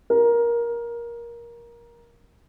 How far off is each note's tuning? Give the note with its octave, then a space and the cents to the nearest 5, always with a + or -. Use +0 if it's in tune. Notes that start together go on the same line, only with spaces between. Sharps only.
A#4 +15